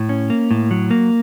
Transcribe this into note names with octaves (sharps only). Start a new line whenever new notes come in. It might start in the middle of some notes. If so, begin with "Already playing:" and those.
Already playing: A2
C#4
A#3
A2
F#3
A#3